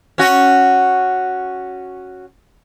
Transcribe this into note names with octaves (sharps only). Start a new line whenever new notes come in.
C#4 F#4